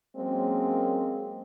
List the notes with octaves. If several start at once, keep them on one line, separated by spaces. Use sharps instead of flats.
F#3 G#3 A#3 C4 C#4